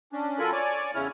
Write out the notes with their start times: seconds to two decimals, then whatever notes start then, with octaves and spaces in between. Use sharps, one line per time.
0.12 C#4 D4
0.39 F#3 F4 A4 A#4 G#5 B5
0.52 C#5 D5 G#5
0.95 E2 C#3 C#4 E4 C#5 F6